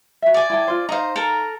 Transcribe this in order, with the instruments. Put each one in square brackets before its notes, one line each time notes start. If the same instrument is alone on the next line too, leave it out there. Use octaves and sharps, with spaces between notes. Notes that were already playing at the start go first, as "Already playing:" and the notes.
[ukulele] F#4 E5
[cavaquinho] D5 G#5
[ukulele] E4 G5 A5
F4 C5
[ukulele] D#4 F5 [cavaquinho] C5 A#5
[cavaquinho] A4 A#4 A#5